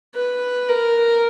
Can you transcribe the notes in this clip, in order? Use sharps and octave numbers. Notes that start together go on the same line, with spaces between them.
B4
A#4